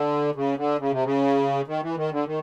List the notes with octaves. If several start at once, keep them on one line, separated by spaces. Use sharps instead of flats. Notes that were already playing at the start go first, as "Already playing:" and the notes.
Already playing: D3
C#3
D3
C#3
C3
C#3
D#3
E3
D#3
D3
D#3